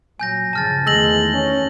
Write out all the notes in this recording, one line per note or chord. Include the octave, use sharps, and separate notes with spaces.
A#2 F#3 G#5 G6 A#6
G2 C#3 F3 A5 F6 A6
E2 D#3 G#3 A3 E6 A#6 F#7
C#4